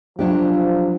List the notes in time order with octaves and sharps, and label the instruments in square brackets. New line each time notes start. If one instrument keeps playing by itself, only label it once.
[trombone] F3 [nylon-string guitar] F#3 D4 G4